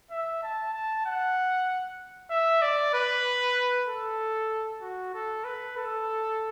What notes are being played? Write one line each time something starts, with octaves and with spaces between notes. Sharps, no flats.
E5
A5
A5
F#5
E5
D5
B4
A4
F#4
A4
B4
A4